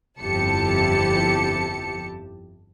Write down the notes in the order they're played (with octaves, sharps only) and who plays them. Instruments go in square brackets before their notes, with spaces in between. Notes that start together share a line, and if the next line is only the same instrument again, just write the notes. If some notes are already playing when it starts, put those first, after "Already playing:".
[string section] G1 F2 E4 G4 A5 C#7